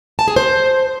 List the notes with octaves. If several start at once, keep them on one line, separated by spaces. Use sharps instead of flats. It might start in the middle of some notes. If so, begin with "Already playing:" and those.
A5
G#4
C5